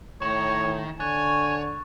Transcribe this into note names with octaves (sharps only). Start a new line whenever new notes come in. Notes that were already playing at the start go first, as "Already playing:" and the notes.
A2 D#3 C#5 E7
D3 C#5 G#5 C#6 F#6 A6